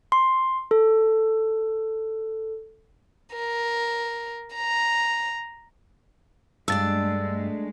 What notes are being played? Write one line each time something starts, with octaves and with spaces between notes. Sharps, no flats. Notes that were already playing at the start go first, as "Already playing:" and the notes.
C6
A4
A#4
A#5
G2 G#3 A3 D4 D5 E6 A6